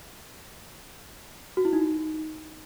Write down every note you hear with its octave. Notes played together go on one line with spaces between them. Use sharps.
F#4
E4
D#4